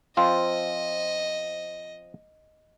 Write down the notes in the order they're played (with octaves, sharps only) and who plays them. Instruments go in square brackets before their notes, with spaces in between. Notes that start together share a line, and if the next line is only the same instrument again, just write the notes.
[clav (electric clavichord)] F3 C4 F4 [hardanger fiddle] D#5